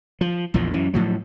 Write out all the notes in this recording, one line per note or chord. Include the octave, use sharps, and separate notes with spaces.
F3
A#1 E2 A#2 F3
F#2 E3
A2 F3 F#3